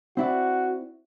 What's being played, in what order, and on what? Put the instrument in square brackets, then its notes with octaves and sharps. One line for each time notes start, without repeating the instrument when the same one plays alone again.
[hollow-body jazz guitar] C4 E4 D5 [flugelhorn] F#4